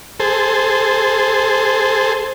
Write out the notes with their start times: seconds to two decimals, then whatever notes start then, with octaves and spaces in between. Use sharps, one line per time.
0.20 G#4 A4 C5